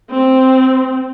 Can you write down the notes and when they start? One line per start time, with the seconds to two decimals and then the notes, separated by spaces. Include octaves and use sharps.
0.10 C4